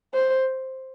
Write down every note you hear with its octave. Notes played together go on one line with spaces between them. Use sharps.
C5